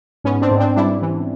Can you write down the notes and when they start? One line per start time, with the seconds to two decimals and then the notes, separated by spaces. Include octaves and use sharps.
0.24 G#2 B3 C#4
0.42 C4 D4
0.51 G#2
0.59 C4 D4
0.76 G3 D4 E4
1.02 E3